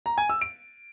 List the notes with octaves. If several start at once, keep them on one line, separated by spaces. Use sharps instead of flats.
A#5
G#5
E6
D7